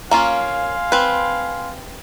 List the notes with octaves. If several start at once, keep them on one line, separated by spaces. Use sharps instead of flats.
A#3 C#4 F4 F5 G#5 C6
C4 B4